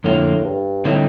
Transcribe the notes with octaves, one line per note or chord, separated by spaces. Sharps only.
F2 A2 D3 F3 A#3 F4
G2
A2 D3 G3 C4 D#4 G4